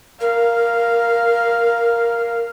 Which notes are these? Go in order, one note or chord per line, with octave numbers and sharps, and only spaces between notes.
A#4 F5